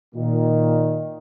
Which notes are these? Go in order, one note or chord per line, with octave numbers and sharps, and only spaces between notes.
A#2 D#3